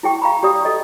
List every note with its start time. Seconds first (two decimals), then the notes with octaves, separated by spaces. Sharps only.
0.03 E4 G#4 G5 C#6
0.22 F5 A#5 B5
0.43 G4 D5 D#6
0.65 A4 D#5